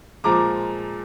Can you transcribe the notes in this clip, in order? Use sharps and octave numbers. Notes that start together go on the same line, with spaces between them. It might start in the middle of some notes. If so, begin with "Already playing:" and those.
A#2 F3 G#3 A#5 D6